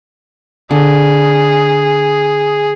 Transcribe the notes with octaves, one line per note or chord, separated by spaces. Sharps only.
D3 G#4